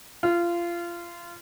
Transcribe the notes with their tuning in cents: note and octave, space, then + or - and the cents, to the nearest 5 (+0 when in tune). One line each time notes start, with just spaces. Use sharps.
F4 -25